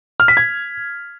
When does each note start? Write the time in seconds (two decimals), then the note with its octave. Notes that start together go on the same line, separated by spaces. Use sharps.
0.20 F6
0.28 B6
0.37 G#6